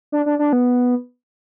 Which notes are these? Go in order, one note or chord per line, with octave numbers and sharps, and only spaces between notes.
D4
D4
D4
B3